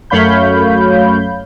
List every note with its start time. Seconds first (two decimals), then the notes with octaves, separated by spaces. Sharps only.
0.10 F#2 A3 C#5 F5 B5 G6